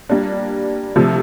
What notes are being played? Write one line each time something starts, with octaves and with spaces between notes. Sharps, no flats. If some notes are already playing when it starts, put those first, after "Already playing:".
G3 A#3 D4
C3 F3 A3